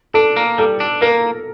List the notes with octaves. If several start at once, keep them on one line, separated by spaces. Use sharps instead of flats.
D4 A4
A#3
G3 A4
D4
A#3 A#4